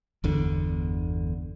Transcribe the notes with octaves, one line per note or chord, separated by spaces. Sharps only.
G1 E2 D3